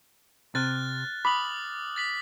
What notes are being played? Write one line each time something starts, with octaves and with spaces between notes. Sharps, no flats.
C3 F6 F#6 A6
B5 D6 D#6 F#7
A6 B6 F#7